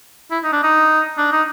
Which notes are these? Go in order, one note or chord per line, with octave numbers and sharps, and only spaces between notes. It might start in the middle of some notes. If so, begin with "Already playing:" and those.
E4
D#4
D4
D#4
D4
D#4